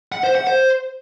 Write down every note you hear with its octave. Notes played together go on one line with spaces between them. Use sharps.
F#5
C5
F#5
C5